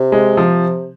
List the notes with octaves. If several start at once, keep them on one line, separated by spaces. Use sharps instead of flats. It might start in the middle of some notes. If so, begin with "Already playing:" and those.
Already playing: C3
G#3
F3